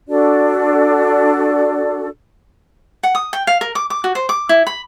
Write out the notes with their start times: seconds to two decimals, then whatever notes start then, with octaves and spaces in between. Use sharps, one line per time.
0.08 D4 F#4 A4 D5
3.03 F#5
3.15 D#6
3.33 G5
3.47 F5
3.61 A#4
3.75 D6
3.90 D6
4.04 F#4
4.15 C5
4.29 D6
4.49 E4
4.67 B5